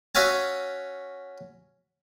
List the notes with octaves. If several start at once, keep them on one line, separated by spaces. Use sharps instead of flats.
C#4 F#4 E5 F5 G#5 A5